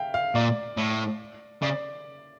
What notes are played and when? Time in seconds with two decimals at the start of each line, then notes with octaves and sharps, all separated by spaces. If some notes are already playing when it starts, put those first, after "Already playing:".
Already playing: E5 F5 G5
0.14 F5
0.35 A#2 D5
0.77 A2
1.62 C#3 D5